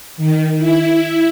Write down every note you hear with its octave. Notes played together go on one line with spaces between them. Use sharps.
D#3
E4